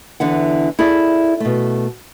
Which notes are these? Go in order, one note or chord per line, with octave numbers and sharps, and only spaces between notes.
E2 D3 E3 F#5
E4 G#4 A4 D5 E5
B2 A3